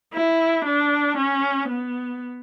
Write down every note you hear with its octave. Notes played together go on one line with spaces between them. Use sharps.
E4
D4
C#4
B3